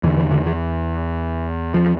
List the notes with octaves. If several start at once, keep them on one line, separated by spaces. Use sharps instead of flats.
E2 D3 E3
E3
D3
E3
F3